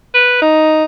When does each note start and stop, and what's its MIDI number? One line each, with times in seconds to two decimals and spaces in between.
0.14 0.37 71
0.42 0.84 63